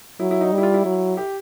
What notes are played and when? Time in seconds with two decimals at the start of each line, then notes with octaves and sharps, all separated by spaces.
0.20 F#3 E4
0.31 E4
0.41 D#4
0.52 G3
0.58 E4
0.63 F4
0.74 E4
0.85 F#3
1.17 G4